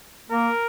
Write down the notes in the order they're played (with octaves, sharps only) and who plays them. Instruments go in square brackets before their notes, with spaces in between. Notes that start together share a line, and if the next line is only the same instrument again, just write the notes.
[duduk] A#3 [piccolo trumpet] A#4